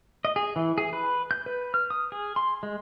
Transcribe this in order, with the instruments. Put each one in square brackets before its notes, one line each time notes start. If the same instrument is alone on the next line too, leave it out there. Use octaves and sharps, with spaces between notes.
[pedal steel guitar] D#5
G#4
E3
G#4
B4
G6
B4
F6
D#6
G#4
C6
G#3